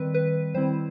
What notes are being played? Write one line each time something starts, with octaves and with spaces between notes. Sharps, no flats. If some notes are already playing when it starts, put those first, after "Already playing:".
Already playing: D#3 G3 C4 B4
B4
D#3 G3 C4 E4 C5